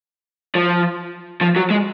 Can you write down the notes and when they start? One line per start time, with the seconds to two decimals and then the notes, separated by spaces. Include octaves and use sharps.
0.55 F3
1.41 F3
1.56 F#3
1.70 G#3